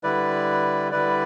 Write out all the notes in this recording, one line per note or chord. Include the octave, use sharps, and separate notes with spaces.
D3 G3 E4 B4 D5
D3 G3 E4 B4 D5